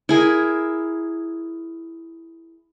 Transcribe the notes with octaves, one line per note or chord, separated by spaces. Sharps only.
E4 G#4 A#4